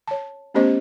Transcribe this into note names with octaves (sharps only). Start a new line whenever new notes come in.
C#5 A5
A3 B3 C#4 G4 C5 D#5